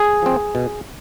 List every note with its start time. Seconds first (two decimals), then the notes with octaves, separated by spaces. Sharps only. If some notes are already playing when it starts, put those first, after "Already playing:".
Already playing: G#4
0.22 F3 C4
0.55 B2